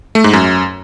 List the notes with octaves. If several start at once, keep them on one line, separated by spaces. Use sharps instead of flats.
A3
G#2
F#2